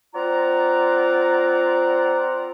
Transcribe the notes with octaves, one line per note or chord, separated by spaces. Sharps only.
C4 F4 D5 F#5 A#5